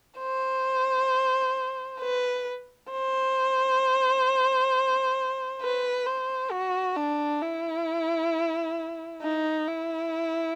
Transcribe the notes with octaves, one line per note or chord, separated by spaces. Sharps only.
C5
B4
C5
B4
C5
F#4
D4
E4
D#4
E4